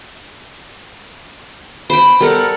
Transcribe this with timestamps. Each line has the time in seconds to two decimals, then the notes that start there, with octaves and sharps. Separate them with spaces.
1.90 C5 G5 B5
2.20 G3 A4 A#4 F#5